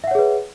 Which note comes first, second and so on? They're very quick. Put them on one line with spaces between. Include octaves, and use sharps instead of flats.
E5 F#5 C#5 G#4 B4